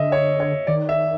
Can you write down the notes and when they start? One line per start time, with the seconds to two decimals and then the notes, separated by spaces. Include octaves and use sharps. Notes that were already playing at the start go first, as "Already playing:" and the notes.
Already playing: D3 D#5 E5
0.12 C#5
0.40 C#5
0.67 D#3 D5
0.89 E5